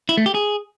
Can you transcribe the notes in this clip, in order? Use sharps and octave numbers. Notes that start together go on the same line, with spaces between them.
E4
A3
G4
G#4